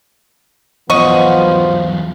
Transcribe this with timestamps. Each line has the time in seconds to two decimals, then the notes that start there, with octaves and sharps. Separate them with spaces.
0.90 E2 F3 F#3 B3 D#5 C#6